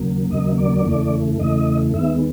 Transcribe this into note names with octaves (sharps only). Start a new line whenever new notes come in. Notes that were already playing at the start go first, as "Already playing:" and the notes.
Already playing: D#2 C#3 F#3 A#3
D#2 C#3 F#3 A#3 D#5
D5
E2 C#3 E3 A3
E2 C#3 E3 A3 D#5
D#2 D#3 G#3 B3 E5